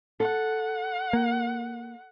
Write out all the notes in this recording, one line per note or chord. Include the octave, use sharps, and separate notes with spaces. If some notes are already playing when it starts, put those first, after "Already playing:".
A4 F#5
A#3